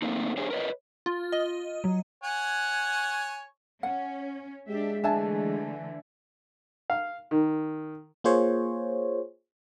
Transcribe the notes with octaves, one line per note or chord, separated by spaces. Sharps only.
A3 A#3 C4 D#4
D4 G4 G#4 C5 C#5
A#4 B4 C#5 D#5
F4
D#5
F#3
C#5 F#5 G#5
C#4 F#5
G#3 D4 G4 E5
D3 E3 A3 D4 E5 G#5 A5
F5
D#3
A#3 F4 G#4 C5 C#5